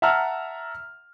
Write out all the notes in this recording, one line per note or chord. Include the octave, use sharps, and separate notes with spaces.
E5 F#5 A5 A#5 E6 F6